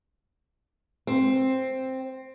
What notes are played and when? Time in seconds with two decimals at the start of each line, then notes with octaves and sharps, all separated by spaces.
1.07 C4